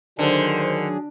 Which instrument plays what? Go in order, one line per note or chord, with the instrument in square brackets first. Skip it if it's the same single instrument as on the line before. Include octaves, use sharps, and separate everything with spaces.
[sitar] D3 [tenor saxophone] D#3 [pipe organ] F#3 D4 G#4 [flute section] C5